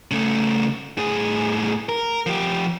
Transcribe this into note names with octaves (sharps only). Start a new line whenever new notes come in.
C#3 A3
A2 G#4
A#4
F3 G4